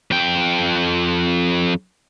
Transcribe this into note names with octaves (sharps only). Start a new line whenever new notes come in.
F2 G5